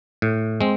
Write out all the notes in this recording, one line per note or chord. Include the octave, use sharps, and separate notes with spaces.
A2
G#3 C4